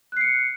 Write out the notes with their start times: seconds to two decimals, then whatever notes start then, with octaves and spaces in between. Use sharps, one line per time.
0.12 F#6
0.17 C7
0.21 C#7